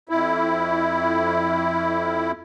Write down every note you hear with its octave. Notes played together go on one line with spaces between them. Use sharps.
F2 E4